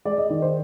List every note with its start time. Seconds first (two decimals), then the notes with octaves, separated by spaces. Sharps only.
0.05 G#3 D5
0.18 D#5
0.30 D#3 D5
0.42 C5